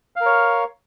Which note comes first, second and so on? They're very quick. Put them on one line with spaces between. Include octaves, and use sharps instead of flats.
F5 A#4 C#5